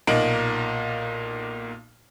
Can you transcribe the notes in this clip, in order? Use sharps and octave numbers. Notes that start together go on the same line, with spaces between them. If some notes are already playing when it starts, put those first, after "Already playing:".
B1 A#2 A#3 D#4 D7 F#7